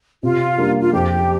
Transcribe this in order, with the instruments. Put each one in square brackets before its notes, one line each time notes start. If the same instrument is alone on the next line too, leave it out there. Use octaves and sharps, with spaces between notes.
[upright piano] C3 [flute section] F4
[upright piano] G3 A#3 D4
[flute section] F4
[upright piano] F2 [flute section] G4